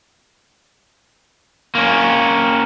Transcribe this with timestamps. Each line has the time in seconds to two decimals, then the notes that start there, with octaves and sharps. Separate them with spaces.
1.75 A#3 C#4